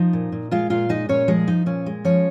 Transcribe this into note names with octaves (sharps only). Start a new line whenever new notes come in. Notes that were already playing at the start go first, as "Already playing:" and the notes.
Already playing: F3 D#4 D#5
A#2
A#2
G#3 F4 F5
A#2 F4 F5
G#3 D#4 D#5
A#2 C#4 C#5
F3 G#3 G#4
F3 D#4
A#2 C#4
G#3
F3 C#4 C#5